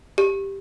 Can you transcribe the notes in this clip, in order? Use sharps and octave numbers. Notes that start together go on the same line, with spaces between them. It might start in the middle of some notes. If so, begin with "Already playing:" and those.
G4